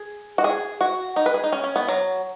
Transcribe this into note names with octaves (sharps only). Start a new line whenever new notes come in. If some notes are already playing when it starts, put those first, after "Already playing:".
Already playing: G#4
F#4
G#4
F#4
D#4
B4
G#4
D#4
C#4
C#4
B3
F#3